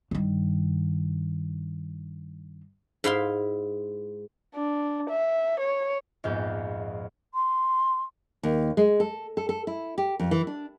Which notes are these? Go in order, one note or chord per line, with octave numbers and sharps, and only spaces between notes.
G2 D#3
G#2 E4 F5 C6
D4
E5
C#5
A#1 F2 G#2 B3 G6
C6
D#2
G#3
A4
A4
A4
E4
G4
F2
E3
D4